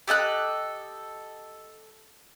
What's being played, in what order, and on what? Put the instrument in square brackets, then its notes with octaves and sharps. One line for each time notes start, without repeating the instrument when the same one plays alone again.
[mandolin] G4 A4 D#5 F#6